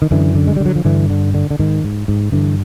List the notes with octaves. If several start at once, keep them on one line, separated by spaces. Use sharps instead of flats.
D#3
F#2 D3 E3
D3
G#3
G3
D3
F#3
F3
G2 D3 E3
D3
D3
D3
G#2 D#3
G#2
G#2
G2 D3 E3